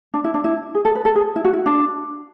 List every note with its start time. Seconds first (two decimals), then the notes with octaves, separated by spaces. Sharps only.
0.14 D4
0.24 E4
0.34 D4
0.44 E4
0.75 G#4
0.85 A4
0.95 B4
1.05 A4
1.15 G#4
1.36 E4
1.45 F#4
1.53 E4
1.66 D4